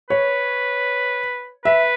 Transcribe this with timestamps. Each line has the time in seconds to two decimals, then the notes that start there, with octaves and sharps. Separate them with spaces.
0.10 B4 C#5
1.65 B4 E5